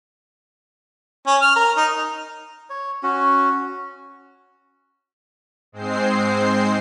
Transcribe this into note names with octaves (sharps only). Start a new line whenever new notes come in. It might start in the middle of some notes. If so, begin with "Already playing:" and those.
C#4
F6
A#4
D#4
C#5
C#4 F#4
G#2 G#3 C4 C5 C7